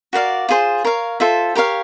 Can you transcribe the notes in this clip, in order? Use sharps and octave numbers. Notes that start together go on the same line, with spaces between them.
F#4 A#4 D5 F5
F4 G#4 C5
A#4 C#5 F5
F4 A4 C5 E5
G4 A#4 C#5 F5